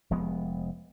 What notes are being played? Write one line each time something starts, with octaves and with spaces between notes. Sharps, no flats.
F1 F3 G#3 B3